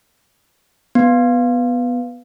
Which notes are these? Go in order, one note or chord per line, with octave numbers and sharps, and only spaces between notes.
B3